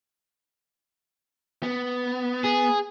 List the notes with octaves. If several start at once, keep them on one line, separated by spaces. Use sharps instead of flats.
B3
G#4